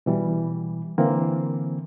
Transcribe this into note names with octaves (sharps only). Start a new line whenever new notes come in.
B2 E3 G3
D3 E3 A#3 C4